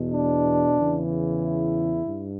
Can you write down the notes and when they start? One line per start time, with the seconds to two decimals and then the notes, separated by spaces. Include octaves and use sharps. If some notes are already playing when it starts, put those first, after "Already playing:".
Already playing: E2 B2
0.12 D4
0.77 E2 C#3 E3
1.42 E4
2.07 G2